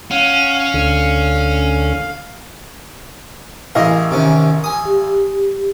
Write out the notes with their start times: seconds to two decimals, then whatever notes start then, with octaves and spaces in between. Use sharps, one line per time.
0.11 C#4 F5 F#5
0.74 D2 D3
3.75 A1 E4 G#4 A#4 D#5 F5
4.11 C3 D#3 C#4
4.64 G#5 D#6
4.85 G4